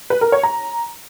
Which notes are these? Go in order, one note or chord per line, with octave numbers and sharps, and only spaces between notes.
B4
A#4
C#5
A#5